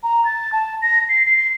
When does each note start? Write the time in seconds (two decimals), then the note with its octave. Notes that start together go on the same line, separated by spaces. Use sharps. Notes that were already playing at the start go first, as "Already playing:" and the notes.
0.03 A#5
0.25 A6
0.52 A5
0.82 A#6
1.09 C7
1.25 C7